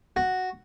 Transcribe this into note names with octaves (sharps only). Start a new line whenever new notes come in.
F#4